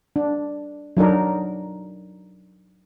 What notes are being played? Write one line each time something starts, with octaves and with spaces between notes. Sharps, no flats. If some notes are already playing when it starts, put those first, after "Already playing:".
D4
F#3 D4 D#4 A#4